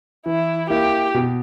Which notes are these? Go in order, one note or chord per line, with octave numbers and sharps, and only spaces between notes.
E3 E4
A#3 E4 G4
B2